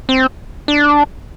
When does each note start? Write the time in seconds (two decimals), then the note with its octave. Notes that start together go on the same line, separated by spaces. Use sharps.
0.09 C4
0.68 D4